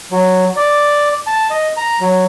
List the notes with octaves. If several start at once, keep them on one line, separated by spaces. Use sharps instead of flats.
F#3
D5
A5
D#5
A#5
F#3